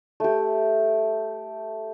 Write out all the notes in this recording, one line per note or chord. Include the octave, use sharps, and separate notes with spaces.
A3 G4